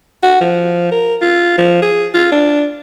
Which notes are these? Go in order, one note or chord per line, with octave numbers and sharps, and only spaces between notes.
F#4
F3
A#4
F4
F3
G#4
F4
D4